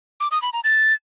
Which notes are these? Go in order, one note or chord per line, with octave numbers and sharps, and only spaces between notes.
D6
D#6
B5
A#5
A6